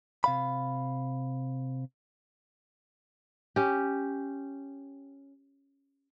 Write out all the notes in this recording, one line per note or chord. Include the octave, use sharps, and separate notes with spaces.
C3 F5 B5
C#4 G4